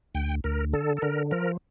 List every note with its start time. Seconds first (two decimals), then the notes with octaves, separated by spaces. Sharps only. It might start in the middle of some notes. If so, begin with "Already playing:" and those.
0.15 D2 G5
0.44 D2 A#4
0.73 D3 A4
0.97 A4
1.02 D3 A#4
1.31 F3 A#4